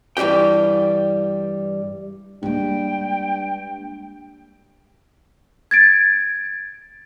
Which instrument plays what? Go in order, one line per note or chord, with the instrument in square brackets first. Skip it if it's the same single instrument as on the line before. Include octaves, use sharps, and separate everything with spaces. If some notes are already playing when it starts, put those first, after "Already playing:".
[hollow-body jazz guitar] G2 E3 G3 G4 G5
[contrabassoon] G2 [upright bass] G#3 A#3 [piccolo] G5
[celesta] G#6 A6 D7